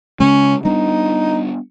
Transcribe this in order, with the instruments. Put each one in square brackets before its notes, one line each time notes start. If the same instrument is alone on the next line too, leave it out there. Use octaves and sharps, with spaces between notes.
[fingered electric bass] C#3 G#3 [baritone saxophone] C#4
[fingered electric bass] G3 B3 D4 [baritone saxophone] D#4